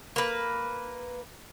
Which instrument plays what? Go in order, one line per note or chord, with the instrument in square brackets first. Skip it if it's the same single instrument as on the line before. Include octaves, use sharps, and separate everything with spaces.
[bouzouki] A#3 B4